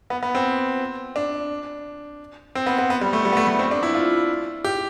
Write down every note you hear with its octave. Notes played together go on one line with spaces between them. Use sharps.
B3
B3
C4
D4
C4
B3
B3
B3
G3
A3
G3
B3
A3
A3
C4
D4
E4
F4
G4